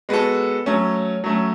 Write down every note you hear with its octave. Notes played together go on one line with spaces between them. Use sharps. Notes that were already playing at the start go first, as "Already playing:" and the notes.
G#3 B3 F#4 A4
F#3 A3 C#4
F#3 A3 C#4